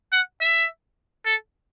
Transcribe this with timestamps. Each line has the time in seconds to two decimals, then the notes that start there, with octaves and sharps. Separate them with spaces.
0.12 F#5
0.41 E5
1.26 A4